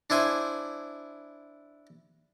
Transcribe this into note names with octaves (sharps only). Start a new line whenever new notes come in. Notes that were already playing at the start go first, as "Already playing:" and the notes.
D4 E4 C5 G#5